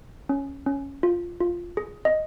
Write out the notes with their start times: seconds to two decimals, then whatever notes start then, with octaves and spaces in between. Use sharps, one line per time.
0.29 C#4
0.66 C#4
1.03 F4
1.40 F4
1.77 G#4
2.05 D#5